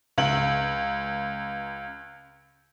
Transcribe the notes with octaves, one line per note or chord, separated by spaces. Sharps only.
C#2 F#7